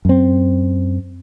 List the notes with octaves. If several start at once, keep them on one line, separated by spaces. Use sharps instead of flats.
F#2 C4